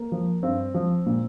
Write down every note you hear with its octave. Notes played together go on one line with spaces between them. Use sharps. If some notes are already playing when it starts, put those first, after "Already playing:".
Already playing: A#3
F3
G2 C4
F3
A#2